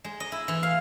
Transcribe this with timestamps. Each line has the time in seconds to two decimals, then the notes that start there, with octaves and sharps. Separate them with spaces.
0.04 G#3
0.20 D#5
0.32 E4
0.48 E3
0.63 F5